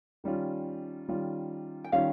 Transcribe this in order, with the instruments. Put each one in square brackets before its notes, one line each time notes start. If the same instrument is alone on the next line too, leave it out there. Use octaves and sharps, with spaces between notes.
[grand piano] D#3 G3 C#4 F4
D#3 G3 C#4 F4
[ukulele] G5
[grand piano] D#3 G3 C#4 F4 [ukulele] F5